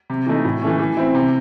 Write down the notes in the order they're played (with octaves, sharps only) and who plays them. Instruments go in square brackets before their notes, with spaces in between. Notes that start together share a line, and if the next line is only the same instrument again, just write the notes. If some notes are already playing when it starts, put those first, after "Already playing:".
[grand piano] C3
E3 A3 D#4
A2
E3 A3 C#4
E3
C4 E4
C3